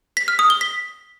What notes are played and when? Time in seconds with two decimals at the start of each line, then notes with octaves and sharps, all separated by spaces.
0.17 B6
0.28 F6
0.39 D#6
0.50 G7
0.61 B6